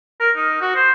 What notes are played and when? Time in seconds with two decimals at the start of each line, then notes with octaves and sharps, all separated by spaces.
0.20 A#4
0.36 D#4
0.61 F#4
0.76 C5